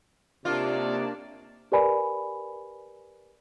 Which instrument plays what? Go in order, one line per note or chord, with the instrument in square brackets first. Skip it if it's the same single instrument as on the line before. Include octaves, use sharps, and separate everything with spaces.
[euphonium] C3 [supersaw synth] A#3 D4 A5 [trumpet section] D#4 C#5 D5 [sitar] F4
[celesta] G4 A#4 B4 D5 G#5 B5